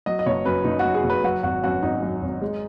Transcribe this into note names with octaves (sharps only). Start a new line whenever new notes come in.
F#3 D#5
D#5
F#1 C#5
F#2 B4
F#1 D#4
F#4
F#3
G#4
F#1
B4
F#3 F#4
G#1 F#4
F#2 F#4
G#1 D#4
F#3
G#1
G#3